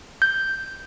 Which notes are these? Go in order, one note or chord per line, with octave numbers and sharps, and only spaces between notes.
G6